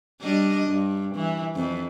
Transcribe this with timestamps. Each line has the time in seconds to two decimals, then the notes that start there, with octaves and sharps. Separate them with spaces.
0.21 G3 D4 D#5
0.68 G2
1.15 E3
1.55 F2